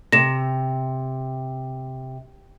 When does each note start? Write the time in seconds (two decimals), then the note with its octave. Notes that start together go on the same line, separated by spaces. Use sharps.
0.12 C3 A#6 E7